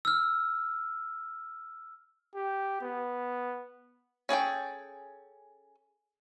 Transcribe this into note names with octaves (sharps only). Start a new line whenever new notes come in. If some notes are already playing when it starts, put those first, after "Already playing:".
E6 F6
G4
B3
C#4 G#4 A4 G5